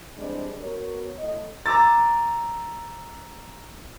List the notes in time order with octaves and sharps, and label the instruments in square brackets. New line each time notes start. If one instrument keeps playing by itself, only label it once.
[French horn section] E3 G3 G#3 C4 D4
B3 F#4 A#4 C#5
A2 D#5
[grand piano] A#5 D6 E6 A6